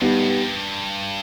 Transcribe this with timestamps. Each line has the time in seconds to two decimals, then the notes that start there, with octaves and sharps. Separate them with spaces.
0.01 G2 G3 B3 D#4 G4
0.19 A2
0.30 G2